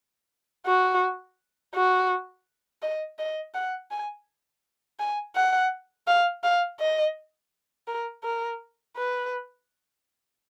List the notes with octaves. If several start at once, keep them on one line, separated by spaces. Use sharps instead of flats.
F#4
F#4
D#5
D#5
F#5
G#5
G#5
F#5
F5
F5
D#5
A#4
A#4
B4